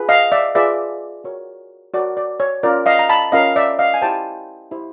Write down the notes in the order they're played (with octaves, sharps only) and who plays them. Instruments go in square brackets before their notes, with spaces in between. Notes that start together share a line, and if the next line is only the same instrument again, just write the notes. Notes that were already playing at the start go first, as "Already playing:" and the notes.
Already playing: [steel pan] F4 G#4 B4
D#5 F5
D5 E5
F4 G#4 B4 D5 E5
F#4 A#4 C#5
F#4 A#4 C#5 D5
D5
C#5
C#4 F4 A#4 D5
D#5 F5
A#5
A5 B5
C#4 F4 A#4 D#5 F5
D5 E5
D#5 F5
G#5
E4 G4 C5 G5 A5
E4 G4 C5